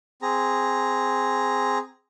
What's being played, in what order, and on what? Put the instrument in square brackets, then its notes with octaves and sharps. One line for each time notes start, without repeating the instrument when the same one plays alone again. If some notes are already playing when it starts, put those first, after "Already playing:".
[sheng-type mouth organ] C4 G#4 A#5